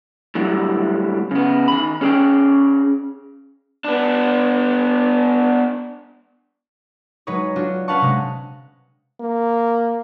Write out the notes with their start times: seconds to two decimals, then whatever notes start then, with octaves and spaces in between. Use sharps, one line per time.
0.35 A2 D3 F#3 G3
1.31 C#3 B3
1.68 D#3 B5
2.01 C#4 G#4 C5 D5 G5
3.84 B3 D4
7.27 F#3 G#3 D#4 B4 C#5
7.56 D4 F4 F#4
7.88 C#4 B4 F5 F#5 A5 C#6
8.01 C3 G#3
9.20 A#3